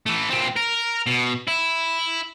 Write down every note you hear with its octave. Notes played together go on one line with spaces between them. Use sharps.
E3 A3
A#2 C4
A#4
B2
E4